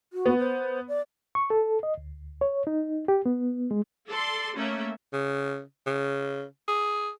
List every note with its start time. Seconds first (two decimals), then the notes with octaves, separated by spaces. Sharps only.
0.13 F#4
0.26 B3
0.39 C5
0.88 D5
1.35 C#6
1.50 A4
1.83 D#5
1.98 D2
2.41 C#5
2.67 D#4
3.08 G4
3.26 B3
3.71 G#3
4.08 A4 D5 C6
4.55 A3 A#3 C#4 E5
5.13 C#3
5.87 C#3
6.68 G#4